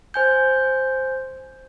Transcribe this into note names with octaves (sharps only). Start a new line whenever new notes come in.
C5 G#5 G6